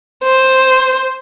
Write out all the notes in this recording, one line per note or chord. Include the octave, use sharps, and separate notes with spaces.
C5